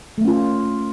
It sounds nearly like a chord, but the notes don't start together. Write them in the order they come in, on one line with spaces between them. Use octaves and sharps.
A3 A#3 C#4 F4